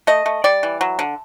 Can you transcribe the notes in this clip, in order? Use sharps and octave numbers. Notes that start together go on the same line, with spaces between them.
A3 D#5
A3
G3 D5
E3
F#3
D3